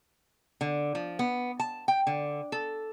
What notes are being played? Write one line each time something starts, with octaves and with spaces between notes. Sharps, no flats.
D3
F3
B3
A5
G5
D3
A4